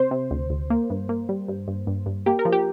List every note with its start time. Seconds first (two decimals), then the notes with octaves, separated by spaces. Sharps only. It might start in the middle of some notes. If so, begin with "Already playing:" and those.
Already playing: C3 C5
0.11 C3
0.31 D2
0.50 D2
0.70 A#3
0.90 G2
1.09 A#3
1.29 G3
1.48 G2
1.68 G2
1.87 G2
2.06 G2
2.26 A#3 G4
2.39 A#4
2.45 F3
2.52 G4